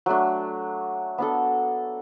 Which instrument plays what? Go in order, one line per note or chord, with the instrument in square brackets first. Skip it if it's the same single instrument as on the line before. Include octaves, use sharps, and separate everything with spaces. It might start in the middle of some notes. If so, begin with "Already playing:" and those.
[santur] F#3 A3 D4
B3 D4 A4